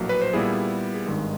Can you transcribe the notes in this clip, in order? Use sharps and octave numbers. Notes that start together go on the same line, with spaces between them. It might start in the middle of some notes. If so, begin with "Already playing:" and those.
Already playing: A#1 A2 F#3 A#3
B4
C5
A#2 G3 B3 E4 G#4
G#4
G#1 G2 D#3 G#3